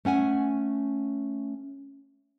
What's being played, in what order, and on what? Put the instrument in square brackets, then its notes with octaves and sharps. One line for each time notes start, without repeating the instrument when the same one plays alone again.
[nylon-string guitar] A3 C#4 F#5 G#5